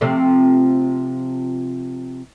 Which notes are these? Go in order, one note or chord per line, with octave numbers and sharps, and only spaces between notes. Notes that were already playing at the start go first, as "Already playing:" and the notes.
C3 F3 A3